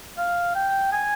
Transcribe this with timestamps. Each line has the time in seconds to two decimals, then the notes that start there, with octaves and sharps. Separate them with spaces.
0.18 F5
0.55 G5
0.92 G#5